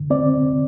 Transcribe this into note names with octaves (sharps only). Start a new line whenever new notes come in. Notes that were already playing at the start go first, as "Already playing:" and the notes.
Already playing: D#2 D3
C4 D5